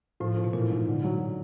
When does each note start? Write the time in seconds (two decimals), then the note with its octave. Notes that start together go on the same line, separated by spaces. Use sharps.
0.20 A2 F3
0.37 F3
0.44 B2
0.53 A#2 E3
0.70 G#2
0.87 D3
1.04 F#3